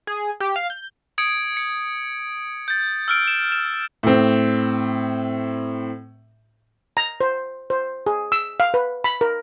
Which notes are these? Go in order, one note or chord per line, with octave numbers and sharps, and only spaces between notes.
G#4
G4
F5
G6
D#6 G#6 C#7 D7
C#7
G6 A6
E6 F6 D7
E7
E7
A2 C4
A#5
C5
C5
G#4
E6
F5
B4
B5
A#4